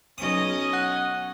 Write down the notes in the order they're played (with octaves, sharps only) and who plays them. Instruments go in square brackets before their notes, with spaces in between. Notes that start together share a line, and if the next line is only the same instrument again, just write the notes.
[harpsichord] B1 D#6 [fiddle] C#4 D#5
[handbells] F#5 F#6